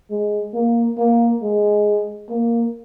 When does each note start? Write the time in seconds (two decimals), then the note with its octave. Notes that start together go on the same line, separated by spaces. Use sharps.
0.10 G#3
0.53 A#3
0.98 A#3
1.42 G#3
2.30 A#3